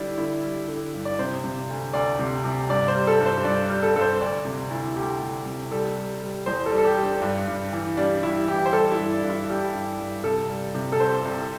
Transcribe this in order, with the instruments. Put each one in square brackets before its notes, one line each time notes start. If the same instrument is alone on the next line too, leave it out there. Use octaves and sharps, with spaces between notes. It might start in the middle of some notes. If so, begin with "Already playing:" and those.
Already playing: [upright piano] D3 G3 D4 E4
D3 E4
G3
D3
G2
D5
C3 C5
C3
D2
D2 D5
C3
C3
G2 D5
C5
G3
A4
G2
C5
G2 D5
G3
A4
G2 A4
C5
D2 D5
C3
D2 E4
D2 G4
D2
C3
G3 A4
G3
G3
E2 C5
A4
G3
A4
G4
G3
D4
G2
G2
E3
G3 D4
D4
G3 E4
E3 G4
C5
G3 A4
E4
G2
D4
G2
E4
G3 G4
G2
G2
C3 A4
G3
C3
A4
C2 C5
C2